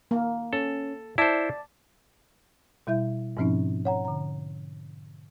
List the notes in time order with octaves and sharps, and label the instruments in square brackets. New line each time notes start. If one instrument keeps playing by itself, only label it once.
[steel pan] A#3
[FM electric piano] C#4 [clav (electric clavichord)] A4
[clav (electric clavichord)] E4 C5 [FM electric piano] D5 A5
[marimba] B2 G3 E4 E5 G6
G#2 B2 F3 C4 C#4 D#4
C#5 F#5 A#5
D3 A#5